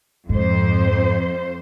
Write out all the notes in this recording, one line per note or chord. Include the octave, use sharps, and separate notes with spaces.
F2 G#2 C5